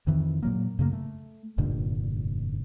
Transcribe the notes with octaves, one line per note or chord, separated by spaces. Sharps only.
F2 D#3 E3
A#2 F#3 A#3
F#2 C#3 A3 A#3
A3
F1 G2 A#2 D3